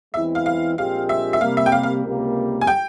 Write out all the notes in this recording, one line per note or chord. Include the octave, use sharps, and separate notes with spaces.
E2 E3 G#3 C4 E4 E5
F5
F5
A#1 A#2 G#3 C4 G4 F5
E5
E5
C3 G3 A#3 F5
E5
G5
F5
F5
C#2 C3 G3 A#3
G#5
G5